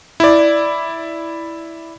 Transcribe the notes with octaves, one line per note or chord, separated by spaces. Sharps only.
E4 D5